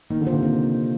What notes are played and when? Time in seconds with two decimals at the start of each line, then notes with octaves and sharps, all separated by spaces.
0.10 D#3 A#3
0.21 D3
0.27 F4 C5
0.32 C3
0.43 A#3